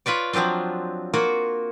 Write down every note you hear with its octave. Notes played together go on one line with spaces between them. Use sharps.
F4 B4 C#5 D5
F3 F#3 C4 D4 F4
A#3 F4 F#4